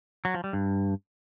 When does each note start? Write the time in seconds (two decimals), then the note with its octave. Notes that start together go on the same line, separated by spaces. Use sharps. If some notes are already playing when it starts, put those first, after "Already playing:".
0.25 F#3
0.34 F3
0.44 G3
0.53 G2